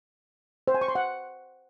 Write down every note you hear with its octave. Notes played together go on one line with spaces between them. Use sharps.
C5
G#5
C#6
C6
F#5